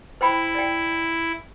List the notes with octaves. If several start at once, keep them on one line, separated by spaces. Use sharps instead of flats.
E4 C5 G5 B5
D5 G5